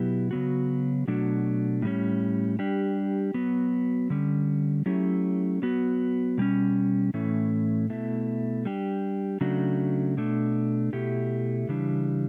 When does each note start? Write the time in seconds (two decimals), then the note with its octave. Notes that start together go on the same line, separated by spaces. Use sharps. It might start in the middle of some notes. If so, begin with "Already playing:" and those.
Already playing: B2 F#3 B3 E4 G4
0.31 C#3 F#3 B3 F#4
1.08 B2 F#3 A3 D4 F#4
1.82 A2 G3 C#4
2.59 G3 D4 G4
3.34 F#3 B3 F#4
4.10 D3 G3 C#4
4.86 F#3 A3 C#4 E4 G4
5.62 F#3 B3 F#4
6.38 B2 G3 C#4
7.14 A2 E3 A3 C#4
7.90 B2 A3 E4
8.65 G3 D4 G4
9.41 C#3 F#3 A3 D4 F#4
10.17 B2 A3 D4
10.93 B2 A3 E4 G4
11.69 C#3 E3 G3 D4